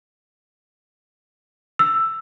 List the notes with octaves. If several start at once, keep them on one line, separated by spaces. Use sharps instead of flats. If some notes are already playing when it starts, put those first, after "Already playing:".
E6